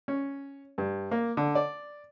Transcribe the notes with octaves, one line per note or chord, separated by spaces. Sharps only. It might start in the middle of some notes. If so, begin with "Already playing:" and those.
C#4
G2
A#3
D3
D5